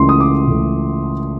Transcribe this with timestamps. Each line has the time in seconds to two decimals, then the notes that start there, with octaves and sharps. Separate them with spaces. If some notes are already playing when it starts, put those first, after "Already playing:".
Already playing: C#2 C#3 E3 A3 C6
0.09 D#6
0.20 D6
0.47 C#2 C#3 E3 A3